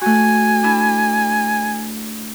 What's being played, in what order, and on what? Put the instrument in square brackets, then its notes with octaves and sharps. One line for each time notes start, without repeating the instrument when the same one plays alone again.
[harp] A3 F#4 [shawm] G#5
[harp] D4 E4